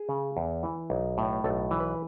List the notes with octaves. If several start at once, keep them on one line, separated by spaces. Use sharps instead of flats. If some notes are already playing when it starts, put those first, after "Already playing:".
Already playing: G#4
C#3
E2
E3
B1
A2
B1 A4
E3
B4